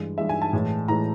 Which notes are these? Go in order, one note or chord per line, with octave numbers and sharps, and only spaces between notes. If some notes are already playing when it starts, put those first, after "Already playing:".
Already playing: G2 E3 G#3
G2 E3 G#3 E5
G#5
A5
A2 E3 G#3
A2 E3 G#3 A#5